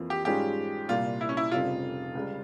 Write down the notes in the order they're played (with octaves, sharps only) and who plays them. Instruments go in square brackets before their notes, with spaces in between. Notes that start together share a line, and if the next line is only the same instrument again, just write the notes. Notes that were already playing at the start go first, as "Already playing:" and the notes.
Already playing: [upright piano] F2 E3 A#3 F4
[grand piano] G4
[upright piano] G#2 G3 C#4 F4 G#4 [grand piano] G4
[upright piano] C2 A#2 G3 [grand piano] F4
[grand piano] E4
C#4
E4
[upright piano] F1 F2 C#3 G3 [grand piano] F4
[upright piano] C#2 C#3 G3